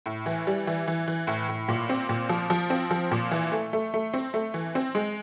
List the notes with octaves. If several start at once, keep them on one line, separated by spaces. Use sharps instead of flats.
A2
E3
G3
E3
E3
E3
A2
A2
A#2
C4
A#2
F3
F3
C4
F3
A#2
E3
A3
A3
A3
C4
A3
E3
C4
G#3